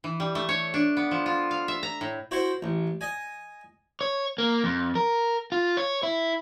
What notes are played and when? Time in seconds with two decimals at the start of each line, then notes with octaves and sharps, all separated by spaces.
0.04 E3
0.20 G3
0.35 A3
0.49 C#5
0.74 D4
0.97 B3
1.11 F3
1.26 F4
1.51 F5
1.68 E5
1.83 A#5
2.01 A2
2.31 E4 F#4 C5
2.62 A1
3.01 D#5 G#5
4.01 C#5
4.38 A#3
4.64 F2
4.95 A#4
5.52 F4
5.77 C#5
6.03 E4